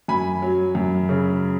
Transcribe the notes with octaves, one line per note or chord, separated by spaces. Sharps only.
F#2 G#5 B5
F#3
F#2
C#3